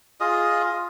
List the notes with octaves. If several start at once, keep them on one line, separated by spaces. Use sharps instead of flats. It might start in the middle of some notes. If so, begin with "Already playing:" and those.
F4 G#4 D#5